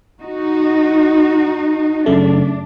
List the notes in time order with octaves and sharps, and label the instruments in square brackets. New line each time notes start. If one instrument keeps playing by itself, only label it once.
[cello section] D#4 F#4
[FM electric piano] F#2 C#3 A3 [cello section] D4